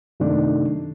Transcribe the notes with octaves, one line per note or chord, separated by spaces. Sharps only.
F#2 C3 D#3 A3 D4 D#4